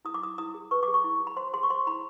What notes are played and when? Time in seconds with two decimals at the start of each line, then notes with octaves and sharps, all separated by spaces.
0.05 E4 D#6
0.14 D6
0.22 E4 D#6
0.38 E4 D#6
0.54 G#4
0.71 B4 C#6
0.83 D6
0.88 G#4
0.94 C#6
1.04 E4
1.20 G#4
1.27 B5
1.37 C5 C6
1.54 G#4 C6
1.63 C#6
1.70 C5 C6
1.87 E4 B5